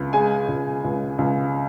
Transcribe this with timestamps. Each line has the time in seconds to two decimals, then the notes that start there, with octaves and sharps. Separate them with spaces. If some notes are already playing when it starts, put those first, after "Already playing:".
Already playing: C#2
0.13 G#3 G#5
0.48 C#2
0.84 C#2
1.18 C#2